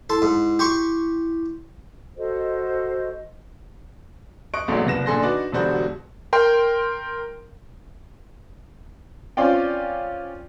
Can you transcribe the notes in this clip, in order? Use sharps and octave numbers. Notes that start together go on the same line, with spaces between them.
E4 A4 C6
G#2
G4 C6 C#6
F#4 A4 C5 D#5
D#5 C#6 F#6 D7
A#1 E2 G#2 F#3 A3
F#1 C2 B3 A#6 E7
A#2 D3 G#4 A4 C6 A#6
D4 D#4 F#4 B4 D5
E1 B2 D3 G3 F#4 C5
A#4 G5 C6
C4 C#4 F4 D5 G5